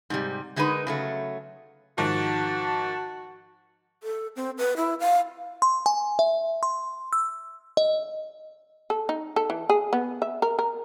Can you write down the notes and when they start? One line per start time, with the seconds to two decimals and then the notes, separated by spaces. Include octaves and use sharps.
0.10 G#2 C3 G3
0.56 D3 G#3 D#4 A#4 B4
0.87 C#3 F#3 A3
1.98 G#2 D#3 F3 F#4 A5
4.03 A4
4.36 C4
4.58 B4
4.77 E4
5.00 F5
5.62 C6
5.86 G#5
6.19 E5
6.63 C6
7.13 E6
7.77 D#5
8.90 A4
9.09 D#4
9.36 A4
9.50 E3
9.70 G#4
9.93 B3
10.22 E5
10.42 A#4
10.59 A#4